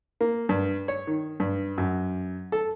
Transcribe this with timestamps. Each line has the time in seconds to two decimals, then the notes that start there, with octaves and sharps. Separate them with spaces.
0.21 A#3
0.49 G2
0.88 C#5
1.07 D#3
1.40 G2
1.78 F#2
2.52 A4